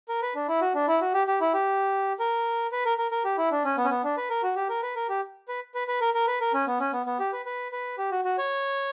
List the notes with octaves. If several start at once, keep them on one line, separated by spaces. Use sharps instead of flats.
A#4
B4
D4
E4
F#4
D4
E4
F#4
G4
G4
E4
G4
A#4
B4
A#4
A#4
A#4
G4
E4
D4
C#4
B3
C#4
B3
D4
B4
A#4
F#4
G4
A#4
B4
A#4
G4
B4
B4
B4
A#4
A#4
B4
A#4
C#4
B3
C#4
B3
B3
G4
B4
B4
B4
G4
F#4
F#4
C#5